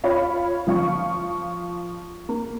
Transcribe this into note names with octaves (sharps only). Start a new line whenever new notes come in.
F4 C#5 F5 B5
F3 F5 C#6
A#3